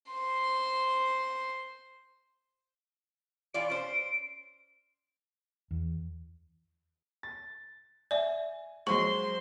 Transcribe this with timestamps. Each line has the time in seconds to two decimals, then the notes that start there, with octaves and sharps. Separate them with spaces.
0.12 C5 C6
3.54 E3 F4 D5 D7
3.70 C#4 C5
5.71 E2
7.23 A6
8.11 D5 E5 G#5
8.87 F#3 G#3 C5 C6 C#6